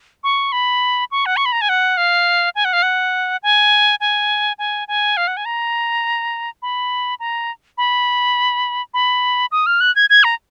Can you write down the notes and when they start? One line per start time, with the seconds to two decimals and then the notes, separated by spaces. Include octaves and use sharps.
0.24 C#6
0.52 B5
1.11 C#6
1.26 F#5
1.37 C#6
1.46 B5
1.52 A#5
1.61 G#5
1.69 F#5
1.97 F5
2.55 G#5
2.65 F#5
2.73 F5
2.83 F#5
3.43 G#5
4.00 G#5
4.59 G#5
4.88 G#5
5.17 F5
5.28 F#5
5.37 G#5
5.45 A#5
6.62 B5
7.20 A#5
7.78 B5
8.94 B5
9.52 D#6
9.66 F6
9.81 F#6
9.96 G#6
10.10 G#6
10.24 A#5